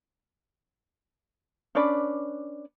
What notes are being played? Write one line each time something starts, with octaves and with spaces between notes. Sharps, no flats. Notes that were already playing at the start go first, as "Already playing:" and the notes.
C#4 D4 B4 D5